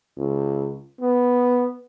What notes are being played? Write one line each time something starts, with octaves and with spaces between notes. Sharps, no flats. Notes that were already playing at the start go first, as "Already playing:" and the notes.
C#2
B3